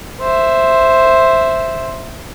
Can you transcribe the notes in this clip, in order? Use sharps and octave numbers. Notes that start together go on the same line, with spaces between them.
C5 E5